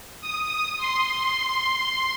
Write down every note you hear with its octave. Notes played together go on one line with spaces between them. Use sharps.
D#6
C6